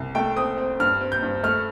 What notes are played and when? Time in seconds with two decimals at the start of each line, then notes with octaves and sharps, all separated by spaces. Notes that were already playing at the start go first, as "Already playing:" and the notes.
Already playing: C2
0.15 A3 G5
0.36 C4 D#6
0.58 C4
0.80 G2 F6
1.01 C4
1.12 G6
1.23 G2
1.43 A3 F6